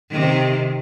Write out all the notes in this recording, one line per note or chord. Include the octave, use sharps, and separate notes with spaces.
C3 D#3